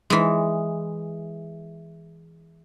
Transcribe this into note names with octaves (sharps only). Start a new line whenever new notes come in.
E3 G#3